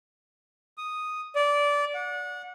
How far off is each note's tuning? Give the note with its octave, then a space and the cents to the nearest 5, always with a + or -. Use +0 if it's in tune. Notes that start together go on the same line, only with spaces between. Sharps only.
D#6 +0
D5 -20
F#5 -30